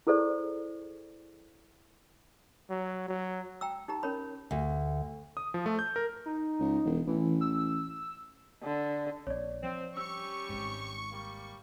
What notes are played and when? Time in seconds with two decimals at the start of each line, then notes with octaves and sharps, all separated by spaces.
0.07 E4 G#4 A4 C5 D5
2.70 F#3
3.09 F#3
3.61 G5 A#5 E6
3.88 D#4 G4 A#5
4.03 C#4 A#4 C#5 B5
4.51 D2
5.37 D#6
5.54 F3
5.66 A3
5.79 G6
5.96 A#4
6.26 D#4
6.60 C#2
6.85 E1
7.07 A1 E3
7.41 E6
8.63 D3
9.27 A#1 C#5 D5
9.63 F3 C4
9.97 G3 C#4 G4 C#6 E6
10.49 G#1 G#2
11.11 G3 A#3